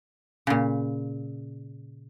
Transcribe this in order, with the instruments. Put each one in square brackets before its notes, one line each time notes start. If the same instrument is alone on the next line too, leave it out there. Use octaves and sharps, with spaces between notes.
[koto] A#2 C#3